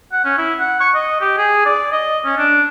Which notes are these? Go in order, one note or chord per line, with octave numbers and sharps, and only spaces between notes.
F#5
C#4
E4
F#5
C#6
D#5
G4
G#4
D5
D#5
C#4
D4